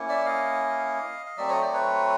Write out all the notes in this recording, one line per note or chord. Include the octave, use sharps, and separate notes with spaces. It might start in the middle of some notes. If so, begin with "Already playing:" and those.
Already playing: A#3 C#4 E4
D5 E5
D#5 F5
F5
F#3 A3 C4 D5 E5
C#5 D#5
C5 D5
B4 C#5